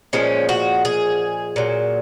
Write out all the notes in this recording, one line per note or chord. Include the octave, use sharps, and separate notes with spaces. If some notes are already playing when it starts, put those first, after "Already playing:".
A#2 F3 G#3 C#4
F#4
G#4
A#2 F#3